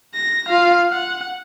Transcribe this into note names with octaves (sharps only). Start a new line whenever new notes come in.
A#6
F4 F5
F#5